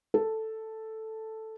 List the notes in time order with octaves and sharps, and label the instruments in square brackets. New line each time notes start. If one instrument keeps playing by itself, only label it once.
[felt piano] A4